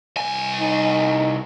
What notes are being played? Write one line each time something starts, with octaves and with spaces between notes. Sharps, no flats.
C2 G#5
D#4